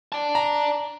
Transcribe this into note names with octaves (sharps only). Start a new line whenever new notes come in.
D5 A5
A#5